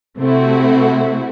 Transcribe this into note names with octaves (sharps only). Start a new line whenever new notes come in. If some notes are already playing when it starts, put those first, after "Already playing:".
C3 A3 C4 E4 F#4